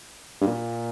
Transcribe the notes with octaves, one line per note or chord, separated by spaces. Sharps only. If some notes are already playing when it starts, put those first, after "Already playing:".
G2
A#2